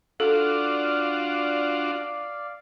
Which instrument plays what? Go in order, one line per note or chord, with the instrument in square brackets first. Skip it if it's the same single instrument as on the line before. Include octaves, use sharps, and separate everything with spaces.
[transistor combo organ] D4 F4 F#4 [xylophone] A4 [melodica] D5 F5